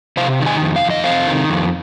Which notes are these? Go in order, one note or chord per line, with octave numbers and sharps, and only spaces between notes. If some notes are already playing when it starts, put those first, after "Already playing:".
C3 C5 F5
D#3
D#5 G#5
F2
F5
F2
D#5
C3 C5 F5
D#3
F2